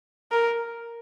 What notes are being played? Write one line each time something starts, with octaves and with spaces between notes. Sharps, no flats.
A#4